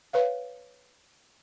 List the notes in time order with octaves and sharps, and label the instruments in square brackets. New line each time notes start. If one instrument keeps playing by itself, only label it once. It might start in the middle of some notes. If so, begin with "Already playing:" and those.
[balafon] B4 C#5 F5